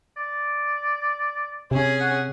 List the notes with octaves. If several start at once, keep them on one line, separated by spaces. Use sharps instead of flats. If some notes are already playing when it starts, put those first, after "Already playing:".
D5
C3 C#4 G#4
F#5